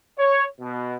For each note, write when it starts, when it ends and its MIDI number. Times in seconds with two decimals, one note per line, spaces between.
0.19 0.44 73
0.60 0.95 47